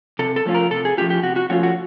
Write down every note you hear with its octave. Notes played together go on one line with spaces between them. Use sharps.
C3 A4
A4
F3 A3 C#4 F4
A#4
C3 A4
G#4
F3 A3 C#4 F4 G4
G4
C3 F#4
F#4
F3 A3 C#4 F4 F#4
F#4